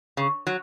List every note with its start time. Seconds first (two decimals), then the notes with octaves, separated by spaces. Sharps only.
0.17 C#3
0.47 F#3